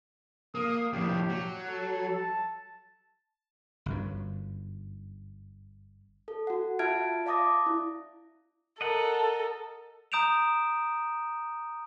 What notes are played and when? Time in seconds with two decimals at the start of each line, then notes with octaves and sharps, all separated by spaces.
0.55 A#3 D#6
0.93 F2 A2 G4
1.29 F#3
1.67 A4
2.15 A5
3.86 G1 F#2
6.28 A4
6.47 F#4 F#5
6.79 F4 E5 A5 F6 G#6 D7
7.26 D5 F5 A5 D6 D#6 A#6
7.66 E4
8.81 A4 A#4 D#5 F#5
10.12 A#5 D#6 G6 D7 E7 F7